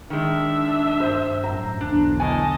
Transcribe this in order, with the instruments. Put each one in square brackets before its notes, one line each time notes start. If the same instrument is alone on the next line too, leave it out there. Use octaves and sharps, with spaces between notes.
[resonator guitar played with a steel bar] D#3 G#3 [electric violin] D4 E5
[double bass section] G2 [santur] C5
[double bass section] F#2 A2 [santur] A#5
[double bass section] B1 E2 D3 [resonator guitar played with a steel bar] D4
[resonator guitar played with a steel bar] A2 G#5 [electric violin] D#5 A5